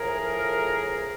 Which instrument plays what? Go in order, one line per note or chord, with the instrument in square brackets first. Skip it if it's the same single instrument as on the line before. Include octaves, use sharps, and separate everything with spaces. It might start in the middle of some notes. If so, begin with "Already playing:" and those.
Already playing: [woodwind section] A2 F3 G#4 A#4